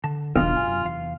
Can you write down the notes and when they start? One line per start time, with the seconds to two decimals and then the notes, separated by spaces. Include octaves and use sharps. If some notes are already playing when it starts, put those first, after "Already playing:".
0.04 D3 A5
0.36 D#1 B1 D#3 D4 F4 F6
0.57 F#2 C3 G#5
0.84 E2 F5